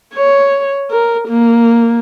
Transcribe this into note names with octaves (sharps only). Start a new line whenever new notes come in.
C#5
A#4
A#3